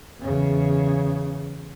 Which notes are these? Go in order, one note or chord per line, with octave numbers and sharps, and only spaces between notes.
E2 C#3